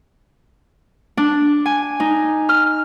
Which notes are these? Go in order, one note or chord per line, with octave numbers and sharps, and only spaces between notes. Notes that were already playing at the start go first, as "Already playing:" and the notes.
D4
G#5
D#4
F6